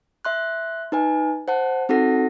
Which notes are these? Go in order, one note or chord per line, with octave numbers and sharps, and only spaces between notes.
E5 C6 F#6
D#4 B4 G#5
C5 F#5 A5
C4 D#4 F#4 A4 F#5 A#6